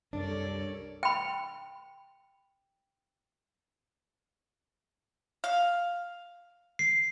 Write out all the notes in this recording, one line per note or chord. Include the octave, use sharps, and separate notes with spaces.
C2 F#2 G3 D4 A4 A#4 C#5 D5
G5 B5
F5
C7